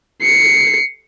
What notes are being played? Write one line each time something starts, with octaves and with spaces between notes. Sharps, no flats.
C7 C#7